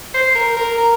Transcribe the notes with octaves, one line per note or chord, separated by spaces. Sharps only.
C5
A#4
A#4
A#4